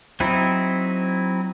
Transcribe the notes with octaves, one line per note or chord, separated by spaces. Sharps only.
F#3 C4 D#4 E4